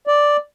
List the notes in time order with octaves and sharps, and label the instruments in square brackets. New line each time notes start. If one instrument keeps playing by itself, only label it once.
[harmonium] D5